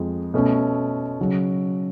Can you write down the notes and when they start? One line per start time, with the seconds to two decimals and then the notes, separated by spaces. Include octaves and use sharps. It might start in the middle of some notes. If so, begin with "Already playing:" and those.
Already playing: F2 F3 G#3
0.34 B2 A3 C#4
1.19 C#3 F#3 C#4